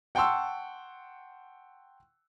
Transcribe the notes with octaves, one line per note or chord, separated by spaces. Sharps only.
F#5 G5 A5 C6 C#6 E6